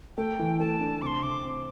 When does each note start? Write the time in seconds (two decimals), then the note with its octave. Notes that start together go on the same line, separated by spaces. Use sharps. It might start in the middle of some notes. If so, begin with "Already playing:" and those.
0.17 A3 G5
0.39 E3
0.60 A3 A5
0.81 D4
1.02 C3 C6 D6
1.22 C3 D6
1.43 C4